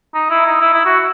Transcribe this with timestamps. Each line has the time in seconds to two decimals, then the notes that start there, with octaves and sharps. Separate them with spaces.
0.14 D#4
0.30 E4
0.46 D#4
0.62 E4
0.74 E4
0.85 F#4